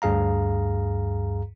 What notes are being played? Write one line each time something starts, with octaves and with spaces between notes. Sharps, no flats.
D2 G2 G#4 F5 A#5